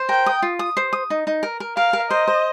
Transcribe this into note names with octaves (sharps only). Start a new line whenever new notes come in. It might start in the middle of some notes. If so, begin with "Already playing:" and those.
Already playing: C5
A#4 G5
D#6
F4
D#6
C5
D#6
D#4
D#4
A#4
A#4
A#4 F5
A#4
C5 D#5
C5